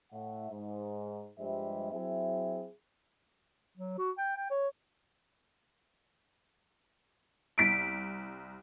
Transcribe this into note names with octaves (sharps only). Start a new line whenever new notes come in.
A2 E5 F#5
G#2
G2 F3 G3 G#3 C5 E5
F#3 C4 E4 G#4 E5
F#3
F#4
G5
G5
C#5
C2 B6 D7